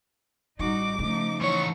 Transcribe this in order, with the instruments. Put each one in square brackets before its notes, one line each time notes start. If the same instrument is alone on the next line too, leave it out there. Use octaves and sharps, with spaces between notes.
[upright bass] A1 G3 [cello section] D#4 F#4 [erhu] D6
[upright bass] C#3 [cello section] F3 A3 D#4
[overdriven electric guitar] E3 C#5 [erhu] C#6